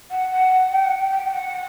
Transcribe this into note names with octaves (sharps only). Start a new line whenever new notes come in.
F#5
F#5
G5
F#5
G5
G5
G5
F#5